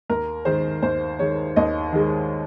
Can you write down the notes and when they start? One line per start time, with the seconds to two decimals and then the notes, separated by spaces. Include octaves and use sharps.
0.09 D#2 A#4
0.45 D#3 G#3 C5
0.82 D#2 C5
1.19 D#3 G#3 C#5
1.56 D#2 D#5
1.93 D#3 G#3